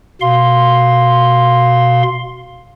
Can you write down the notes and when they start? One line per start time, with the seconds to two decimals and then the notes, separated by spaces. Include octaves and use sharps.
0.21 B2 F5 C6